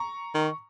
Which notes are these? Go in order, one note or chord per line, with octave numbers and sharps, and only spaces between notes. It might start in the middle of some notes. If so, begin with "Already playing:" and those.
Already playing: A#5 C#6
D#3